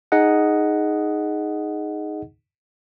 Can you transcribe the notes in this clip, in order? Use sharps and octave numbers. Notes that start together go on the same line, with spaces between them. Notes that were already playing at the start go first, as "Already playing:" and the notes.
D#4 G#4 D#5 F#5